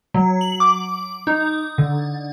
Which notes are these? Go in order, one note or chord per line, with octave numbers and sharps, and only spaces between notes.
F#3
F#7
D6
D#4
D3